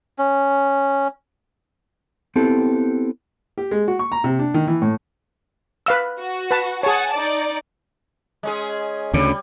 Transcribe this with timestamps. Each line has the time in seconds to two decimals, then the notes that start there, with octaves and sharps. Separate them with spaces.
0.18 C#4
2.36 B3 C4 E4 G4 A4
3.58 G4
3.71 G#3
3.88 F#4
3.99 C#6
4.12 A#5
4.24 C3
4.39 D4
4.54 D#3
4.68 E3
4.82 A2
5.86 B4 F5 E6
6.19 F#4
6.51 B4 A5
6.83 G#4 C#5 F#5 G#5 A5
7.14 D#4 D5
8.43 G#3 C#4 G#4
9.14 D2 C#3 G3